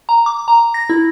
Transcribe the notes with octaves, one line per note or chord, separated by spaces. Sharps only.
A#5
D6
A#5
A#6
E4